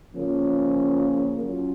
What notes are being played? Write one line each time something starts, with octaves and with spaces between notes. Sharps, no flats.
C#3 F3 A#3 C#4 F4
F#3 C#4 F4